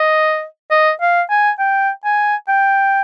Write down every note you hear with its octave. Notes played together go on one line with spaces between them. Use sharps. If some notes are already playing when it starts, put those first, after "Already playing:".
Already playing: D#5
D#5
F5
G#5
G5
G#5
G5